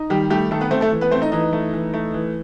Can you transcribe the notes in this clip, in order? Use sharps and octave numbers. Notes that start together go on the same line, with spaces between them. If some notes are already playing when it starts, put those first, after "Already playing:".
Already playing: D#4
D#3 G3 G4
G3 A3 G4
D#3 A3 A4
B3 B4
A3 C4 C5
A3 A4
E3
B3 B4
A3 C4 C5
D#4 D#5
E3 D#4 D#5
A3
E3
A3
E3